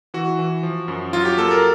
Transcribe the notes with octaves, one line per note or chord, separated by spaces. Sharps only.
E3 F#4
E3
F3
F#2
F#3 F4
G4
A#3 A4
A#4